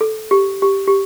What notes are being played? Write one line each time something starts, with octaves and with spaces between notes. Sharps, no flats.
A4
G4
G4
G4